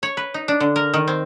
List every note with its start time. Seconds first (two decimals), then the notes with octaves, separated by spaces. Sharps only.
0.03 C#5
0.17 B4
0.34 D#4
0.48 D4
0.60 D3
0.76 A#4
0.94 D#3
1.08 C4